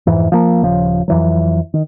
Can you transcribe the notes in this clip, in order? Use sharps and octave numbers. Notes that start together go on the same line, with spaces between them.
F2 G#2 E3
F3 A#3
D#1 C#3 F3
F2 E3 F#3
D#3